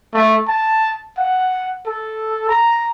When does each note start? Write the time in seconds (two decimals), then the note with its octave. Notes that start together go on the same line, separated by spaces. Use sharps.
0.14 A3
0.47 A5
1.18 F#5
1.86 A4
2.49 A#5